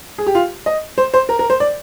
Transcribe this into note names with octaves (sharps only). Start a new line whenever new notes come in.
G#4
G4
F4
D#5
C5
C5
A#4
A#4
C5
D5